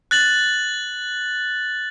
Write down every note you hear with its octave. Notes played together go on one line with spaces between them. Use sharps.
F#6 A6 F#7